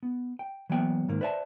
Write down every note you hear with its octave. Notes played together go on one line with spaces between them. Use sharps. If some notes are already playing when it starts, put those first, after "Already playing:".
B3
G5
E3 F#3 A#3 B3 G5
G#2 D#3 A#3
B4 C5 D5 E5 F#5 A5